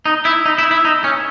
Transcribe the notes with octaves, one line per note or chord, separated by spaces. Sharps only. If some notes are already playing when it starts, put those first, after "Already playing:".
D#4
E4
D#4
E4
E4
D#4
C#4